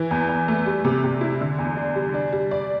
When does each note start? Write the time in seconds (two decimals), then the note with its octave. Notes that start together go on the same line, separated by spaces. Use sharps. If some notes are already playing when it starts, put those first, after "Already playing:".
Already playing: E3
0.11 E2
0.29 E2
0.48 A3
0.66 G3
0.85 C3
1.04 C3
1.21 E4
1.41 D3
1.59 E2
1.77 D4
1.95 G3
2.14 D4
2.33 G3
2.51 D5